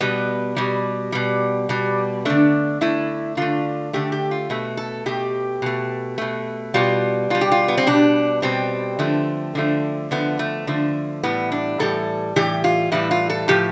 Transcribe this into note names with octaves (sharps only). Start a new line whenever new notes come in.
B2 G3 B3
B2 G3
B2 G3
B2 G3
D3 A3 D4
D3 A3 E4
D3 A3 F4
D3 A3 G4
G4
F4
B2 A3
A4
B2 A3 G4
B2 A3
B2 A3
B2 G3 F4
B2 G3 F4
G4
F4
B3
C4
B2 G3 D4
B2 G3 C4
D3 F3 A3
D3 F3 A3
D3 F3 A3 B3
A3
D3 F3 A3
A2 E3 G3 B3
D4
A2 E3 G3 A4
A2 E3 G3 G4
F4
A2 E3 G3 E4
F4
A4
A2 F3 A3 G4